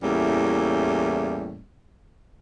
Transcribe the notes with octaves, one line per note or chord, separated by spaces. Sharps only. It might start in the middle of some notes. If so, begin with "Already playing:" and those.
E2 A2 G3 A3 A#3 C#4